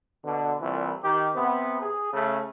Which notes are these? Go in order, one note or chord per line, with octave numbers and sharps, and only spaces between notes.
B2 D3
C2 A#2 E3
D#3 G4
C3 B3
G#4
C#3 A3